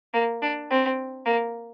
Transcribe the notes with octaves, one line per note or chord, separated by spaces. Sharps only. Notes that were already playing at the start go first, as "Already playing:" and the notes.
A#3
D4
C4
A#3